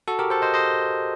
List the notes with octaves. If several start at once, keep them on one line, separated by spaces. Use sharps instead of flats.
F#4 A4
G4 A#4
A4 C5
C5 D#5
C5 D#5